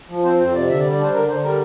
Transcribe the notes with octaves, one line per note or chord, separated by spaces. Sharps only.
F3
C4 C5
F2 C5
C3 D5
D3 E5
D5
G3
D5
D4 C5
D3 A#4
D3 C5
G3 A#4